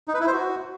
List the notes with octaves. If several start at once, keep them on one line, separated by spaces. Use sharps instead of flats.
D#4
B4
E4
C5
F#4